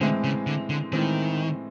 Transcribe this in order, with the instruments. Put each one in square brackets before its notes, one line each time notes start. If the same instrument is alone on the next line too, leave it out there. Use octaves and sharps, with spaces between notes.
[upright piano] A2 E3 G#3 C4 [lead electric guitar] D3
[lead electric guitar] C#3
D3
D3
[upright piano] A2 E3 G#3 C4 [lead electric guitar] D#3